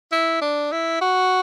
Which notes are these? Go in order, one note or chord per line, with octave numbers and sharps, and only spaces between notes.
E4
D4
E4
F#4